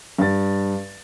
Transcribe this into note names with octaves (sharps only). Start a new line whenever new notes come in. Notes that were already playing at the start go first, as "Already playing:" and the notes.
G2 A6